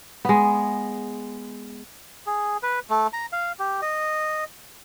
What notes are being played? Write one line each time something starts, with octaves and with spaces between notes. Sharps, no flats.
G#3 B3
G#4
B4
A3
A#5
F5
G4
D#5